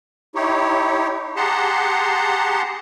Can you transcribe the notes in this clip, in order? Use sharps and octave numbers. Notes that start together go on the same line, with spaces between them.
D#4 E4 G4 C#5
G4 G#4 F#5 A5 A#5 C6